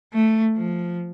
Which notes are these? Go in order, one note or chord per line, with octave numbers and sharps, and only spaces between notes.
A3
F3